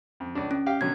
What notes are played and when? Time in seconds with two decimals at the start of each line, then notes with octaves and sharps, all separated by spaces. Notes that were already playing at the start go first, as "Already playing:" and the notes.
0.20 F2
0.35 C#2 D4
0.51 C#4
0.66 G4 F5 G5
0.81 B2 D3 F#3 G#6